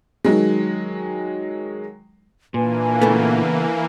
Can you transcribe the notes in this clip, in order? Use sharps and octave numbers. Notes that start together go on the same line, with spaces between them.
D#3 F#3 G#3
A#2 E3 A#3 D4 B4 G#5
C#3 A3 B3